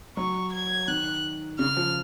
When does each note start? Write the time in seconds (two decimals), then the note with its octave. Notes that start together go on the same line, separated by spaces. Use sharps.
0.17 F#3 C#6
0.53 G#6
0.88 D#3 F#6
1.59 C#3 F6
1.77 F3